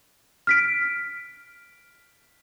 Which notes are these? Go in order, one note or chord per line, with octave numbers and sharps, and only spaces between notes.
F6 B6 D7